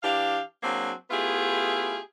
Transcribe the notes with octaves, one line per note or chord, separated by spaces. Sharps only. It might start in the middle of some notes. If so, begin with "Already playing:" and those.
E3 D4 G4 F5
F#3 A#3 C4 D4 F#4 G#4
A3 B3 E4 F4 G4 G#4